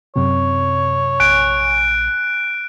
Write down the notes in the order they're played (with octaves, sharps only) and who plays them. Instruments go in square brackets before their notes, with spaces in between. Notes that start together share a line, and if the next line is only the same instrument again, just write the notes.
[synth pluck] F#2 C3 [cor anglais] C#5
[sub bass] A#1 [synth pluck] G#5 [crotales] F#6 D7